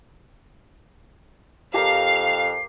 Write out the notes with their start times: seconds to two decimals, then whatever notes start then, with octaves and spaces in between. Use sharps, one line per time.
1.74 F2 G4 A#4 F5 A#5 C7